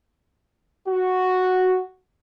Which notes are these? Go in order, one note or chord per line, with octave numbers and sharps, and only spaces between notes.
F#4